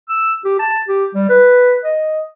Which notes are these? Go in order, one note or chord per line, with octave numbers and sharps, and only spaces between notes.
E6
G4
A5
G4
G3
B4
D#5